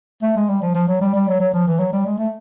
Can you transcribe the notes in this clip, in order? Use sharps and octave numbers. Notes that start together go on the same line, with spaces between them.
A3
G#3
G3
F3
F3
F#3
G3
G3
F#3
F#3
F3
E3
F#3
G3
G#3
A3